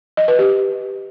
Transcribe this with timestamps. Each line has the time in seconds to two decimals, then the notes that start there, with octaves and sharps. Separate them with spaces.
0.17 D#5
0.28 B4
0.39 G4